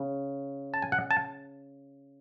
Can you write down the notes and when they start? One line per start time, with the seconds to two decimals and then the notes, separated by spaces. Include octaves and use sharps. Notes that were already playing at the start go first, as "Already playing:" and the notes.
Already playing: C#3
0.74 A5
0.82 G#5
0.92 F#5
1.11 A5